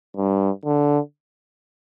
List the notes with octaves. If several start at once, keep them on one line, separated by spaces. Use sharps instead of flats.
G2
D3